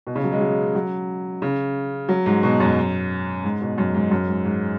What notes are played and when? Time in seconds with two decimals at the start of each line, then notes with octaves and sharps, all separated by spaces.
0.07 B2
0.16 C#3
0.24 F#3
0.32 G#3
0.41 F#3
0.75 F#3
1.42 C#3
2.09 F#3
2.26 G#2
2.43 B2
2.60 F#2
3.44 G#2
3.61 B2
3.78 F#2
3.94 G#2
4.11 F#2
4.28 G#2
4.45 G#2